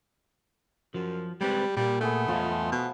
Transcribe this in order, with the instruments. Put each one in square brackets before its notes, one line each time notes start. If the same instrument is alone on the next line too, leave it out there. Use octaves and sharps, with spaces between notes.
[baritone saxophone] F#2 [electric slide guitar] F3
[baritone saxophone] G3 [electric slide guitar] G#3 C4 B4
[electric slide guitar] A#2 A#3 [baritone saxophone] G3
[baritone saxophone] A3 [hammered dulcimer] B3 G#4 F#5
[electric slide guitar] E2 F4 D#5 [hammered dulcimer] F3 G#4 E5
[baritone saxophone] B2